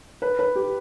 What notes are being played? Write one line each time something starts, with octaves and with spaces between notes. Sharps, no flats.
B4
B4
G4